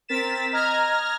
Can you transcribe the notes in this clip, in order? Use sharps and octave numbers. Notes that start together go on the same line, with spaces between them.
C4 A#4 A6 B6 E7
D#5 A#5 F6 G#6 A#6